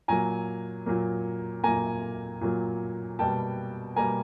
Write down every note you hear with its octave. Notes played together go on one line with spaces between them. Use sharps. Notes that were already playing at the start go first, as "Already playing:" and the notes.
A#2 F#3 A#3 G#5 A#5
A#2 F#3 A#3
A#2 F#3 A#3 G#5 A#5
A#2 F#3 A#3
B2 G3 A#3 G5 A5
B2 G3 A#3 G#5 A#5